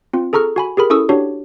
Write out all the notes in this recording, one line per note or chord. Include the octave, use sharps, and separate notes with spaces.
C4 F4
G#4 A4 A#5 C#6 F6
F#4 G#5 B5
G4 G#4 A#4 B5
C#4 E4 A4 C#6 D#6 E6
D4 F#4 G4 C#5